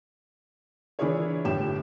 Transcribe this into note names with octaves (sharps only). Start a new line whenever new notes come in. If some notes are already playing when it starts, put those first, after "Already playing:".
E3 D4 E4 G#4 A#4 C#5
G1 A2 G4 G5 E7